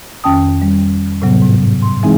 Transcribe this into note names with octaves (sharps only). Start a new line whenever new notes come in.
F2 D#3 C#4 G5 A5 D#6
G3
A2 C3 F#3 B3
G#2
C6
E3 G#3 C4 D#4 E4 G#4